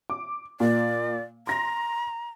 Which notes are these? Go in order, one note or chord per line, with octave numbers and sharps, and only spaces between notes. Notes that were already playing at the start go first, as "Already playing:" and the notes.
D6
A#2 D5
A#5 C6 A#6